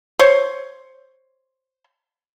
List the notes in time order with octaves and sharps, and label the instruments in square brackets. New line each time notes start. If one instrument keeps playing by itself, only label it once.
[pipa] C5 C#5